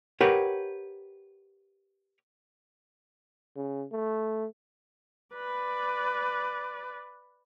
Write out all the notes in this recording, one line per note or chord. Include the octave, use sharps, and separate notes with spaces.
G4 A#4 B4 C#5 F#5
C#3
A3
B4 D5